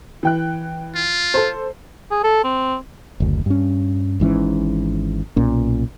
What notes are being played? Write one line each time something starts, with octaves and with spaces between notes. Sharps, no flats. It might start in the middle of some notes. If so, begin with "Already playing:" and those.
E3 G5 F#6
F4
A4 C5
G#4
A4
C4
F#1 D2
G2 C#4
G#1 G#2 E3 C#4
B1 A#2 C#4